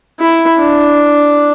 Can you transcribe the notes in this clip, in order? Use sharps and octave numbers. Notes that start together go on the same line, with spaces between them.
E4
D4